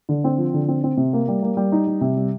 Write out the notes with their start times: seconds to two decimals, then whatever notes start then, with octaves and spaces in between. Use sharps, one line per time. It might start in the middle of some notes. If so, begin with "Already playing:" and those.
0.09 D3
0.24 C4
0.38 F3
0.54 D3
0.68 C4
0.84 C4
0.97 C3
1.13 A#3
1.28 G3
1.42 A#3
1.57 G3
1.72 D#4
1.87 G3
2.01 C3
2.17 G3